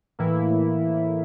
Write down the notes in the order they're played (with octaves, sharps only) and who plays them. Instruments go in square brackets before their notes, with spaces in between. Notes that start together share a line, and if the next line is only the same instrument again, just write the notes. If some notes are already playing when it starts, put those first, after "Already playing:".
[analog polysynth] A2 E3 A#3 E4